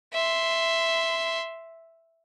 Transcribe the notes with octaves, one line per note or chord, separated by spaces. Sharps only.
E5 C6